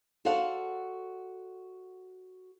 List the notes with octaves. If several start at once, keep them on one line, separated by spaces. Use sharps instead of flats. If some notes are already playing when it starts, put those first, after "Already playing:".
F#4 A4 C5 D5 F5 F#5